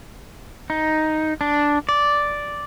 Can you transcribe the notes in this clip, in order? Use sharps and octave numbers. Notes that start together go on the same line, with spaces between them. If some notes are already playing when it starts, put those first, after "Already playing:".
D#4
D4
D5